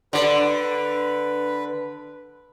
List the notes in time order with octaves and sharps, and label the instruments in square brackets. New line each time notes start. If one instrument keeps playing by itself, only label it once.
[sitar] D3 D5 [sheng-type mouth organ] B4